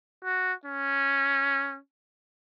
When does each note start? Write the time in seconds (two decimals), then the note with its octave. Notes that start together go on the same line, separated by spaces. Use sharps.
0.25 F#4
0.66 C#4